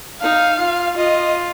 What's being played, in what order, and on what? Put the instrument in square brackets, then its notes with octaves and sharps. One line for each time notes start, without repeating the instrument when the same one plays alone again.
[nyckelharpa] D#4 [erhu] F5
[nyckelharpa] F4
[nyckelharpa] F4 [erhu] D#5